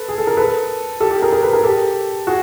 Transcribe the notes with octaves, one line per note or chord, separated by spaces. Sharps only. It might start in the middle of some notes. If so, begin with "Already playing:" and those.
Already playing: A4 B4
G#4
A4
A#4
A4 B4
G4 A4
G4 A4
G#4 A#4
G#4 A#4
A4 B4
G#4 A#4
G4 A4
F#4 G#4